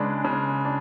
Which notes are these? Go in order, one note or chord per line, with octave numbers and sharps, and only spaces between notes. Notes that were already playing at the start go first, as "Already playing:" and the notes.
Already playing: C#3 G#3 D4 B4
C#3
D4